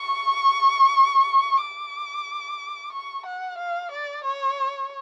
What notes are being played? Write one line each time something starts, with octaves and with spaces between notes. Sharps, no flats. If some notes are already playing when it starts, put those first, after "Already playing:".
Already playing: C#6
D6
C#6
F#5
F5
D5
C#5